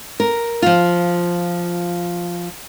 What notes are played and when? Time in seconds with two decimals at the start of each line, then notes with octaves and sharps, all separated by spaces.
0.20 A#4
0.62 F3 F4